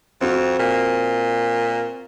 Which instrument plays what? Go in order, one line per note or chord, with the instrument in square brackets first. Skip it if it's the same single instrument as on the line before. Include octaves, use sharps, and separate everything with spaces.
[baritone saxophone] F2 [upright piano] C4 F#4
[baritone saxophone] A#2